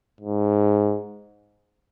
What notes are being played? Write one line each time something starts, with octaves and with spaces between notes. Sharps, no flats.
G#2